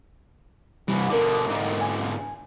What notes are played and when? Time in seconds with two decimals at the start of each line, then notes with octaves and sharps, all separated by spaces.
0.88 C2 E3 G3
1.10 B2 D3 A#4 D6
1.47 G#2 D3
1.81 G#5